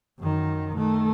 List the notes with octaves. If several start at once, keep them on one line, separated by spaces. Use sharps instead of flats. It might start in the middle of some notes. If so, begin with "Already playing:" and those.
F#2 D#3
D#3 A3